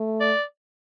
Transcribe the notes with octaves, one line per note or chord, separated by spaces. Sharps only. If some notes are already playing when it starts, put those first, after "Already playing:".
Already playing: A3
D5